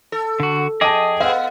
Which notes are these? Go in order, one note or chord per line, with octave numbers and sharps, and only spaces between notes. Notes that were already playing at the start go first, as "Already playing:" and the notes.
A4
D3 F#4
F2 G#4 D#5 G5 A5 D6 D#6
B3 F5 F#5